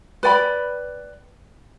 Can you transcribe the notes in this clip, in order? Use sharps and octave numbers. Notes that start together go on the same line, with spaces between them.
B4 D5 G5 B5